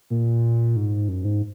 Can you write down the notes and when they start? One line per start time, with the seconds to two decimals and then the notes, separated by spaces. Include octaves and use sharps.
0.10 A#2
0.76 G#2
1.08 F#2
1.25 G#2